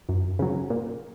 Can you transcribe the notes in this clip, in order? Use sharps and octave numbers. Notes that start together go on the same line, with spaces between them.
F#2
C#3 F#3
A#2